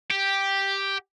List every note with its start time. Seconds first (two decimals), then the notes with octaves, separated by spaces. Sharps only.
0.11 G4